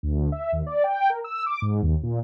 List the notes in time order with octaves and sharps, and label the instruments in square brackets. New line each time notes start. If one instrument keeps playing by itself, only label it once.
[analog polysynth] D2
E5
D#2
D5
G5
A#4
E6
D6
G#2
D#2
A#2